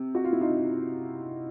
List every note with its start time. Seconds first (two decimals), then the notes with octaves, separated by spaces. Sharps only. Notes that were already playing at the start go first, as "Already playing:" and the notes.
Already playing: C3
0.15 F#4
0.24 F4
0.33 E4
0.41 D#4 F4